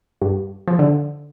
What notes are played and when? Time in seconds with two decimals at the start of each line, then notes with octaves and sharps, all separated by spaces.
0.21 G2
0.68 F3
0.79 D3